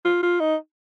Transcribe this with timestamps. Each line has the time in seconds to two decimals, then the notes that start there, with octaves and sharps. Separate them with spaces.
0.05 F4
0.23 F4
0.40 D#4